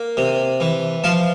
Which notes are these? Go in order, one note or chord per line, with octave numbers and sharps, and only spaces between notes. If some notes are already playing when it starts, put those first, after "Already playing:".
Already playing: A#3
C3
E3
F3 F5 A5